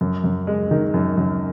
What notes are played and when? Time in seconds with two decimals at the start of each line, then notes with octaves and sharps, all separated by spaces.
0.01 F#2
0.24 F#2
0.47 G#3
0.71 D#3
0.94 F#2
1.17 F#2